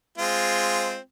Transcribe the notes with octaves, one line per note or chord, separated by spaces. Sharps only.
G#3 C4 F4